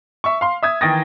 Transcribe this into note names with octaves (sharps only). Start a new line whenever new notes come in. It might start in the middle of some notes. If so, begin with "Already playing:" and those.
E5 C#6
F5 C6
E5 D#6 G#6
D#3 E3 G5 D#6 A6 A#6